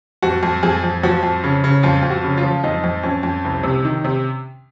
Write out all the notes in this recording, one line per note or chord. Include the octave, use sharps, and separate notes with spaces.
F2 F#4
F2
F2 G#4
F2
F3 F#4
F2
C#3
C#3
F2 F4
F2
F#4
C#3
F4
F3
F2 D#4
F2
F2 C#4
F2
C2
C3
D#3
C3